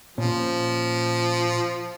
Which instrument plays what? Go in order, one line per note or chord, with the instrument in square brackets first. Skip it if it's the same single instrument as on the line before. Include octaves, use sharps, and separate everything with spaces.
[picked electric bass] A#2 C#4 [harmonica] F3